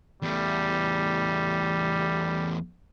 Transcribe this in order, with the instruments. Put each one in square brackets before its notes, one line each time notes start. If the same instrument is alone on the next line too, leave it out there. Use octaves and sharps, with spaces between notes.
[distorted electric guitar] E2 A3 [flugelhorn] G3